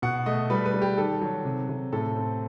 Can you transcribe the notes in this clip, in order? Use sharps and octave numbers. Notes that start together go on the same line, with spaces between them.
B2 F#5
A3 D#5
G3 B4
B4
G3
G4
D#3 A4
F#3
C3
C3
A2 A4
C4